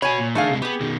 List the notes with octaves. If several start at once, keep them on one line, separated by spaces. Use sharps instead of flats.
F#4 C#5 G#5 B5
A#2
D#3 A3 D4 G#4 F5
C3 G#3
B3 G4 G#4
B2 D#3